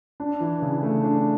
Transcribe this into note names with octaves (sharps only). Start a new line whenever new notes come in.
D4
E3
C#3
A3
D4